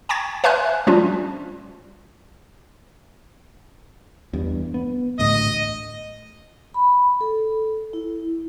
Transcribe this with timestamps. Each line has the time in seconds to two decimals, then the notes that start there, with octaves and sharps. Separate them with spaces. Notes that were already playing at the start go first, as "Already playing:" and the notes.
0.09 G5 A5 C#6 G#6 A6
0.44 B4 E5 G#5 C6 F6 F#6
0.87 F3 G3 C#4 D4 F4
4.33 E2 G2
4.74 B3
5.19 A1 D2 A2 D#5
6.74 B5
7.21 A4
7.93 E4